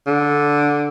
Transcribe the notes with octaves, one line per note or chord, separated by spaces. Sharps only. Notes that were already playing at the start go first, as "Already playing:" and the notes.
D3